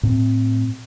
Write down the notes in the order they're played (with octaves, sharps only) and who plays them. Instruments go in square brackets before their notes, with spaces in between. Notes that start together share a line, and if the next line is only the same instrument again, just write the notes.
[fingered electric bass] A2 C4